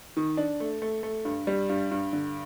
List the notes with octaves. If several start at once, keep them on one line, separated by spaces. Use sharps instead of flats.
D#3
D4
A3
A3
A3
G2
G3
G2
G2
D3